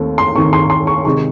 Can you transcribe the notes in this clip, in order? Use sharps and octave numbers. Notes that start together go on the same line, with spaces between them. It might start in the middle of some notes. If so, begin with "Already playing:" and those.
Already playing: D#2 D#3 A3 C4
C6
D#2 D#3 A3 C4 C#6
C6
C6
C#6
C3 D#3 G#3 D#4 C#6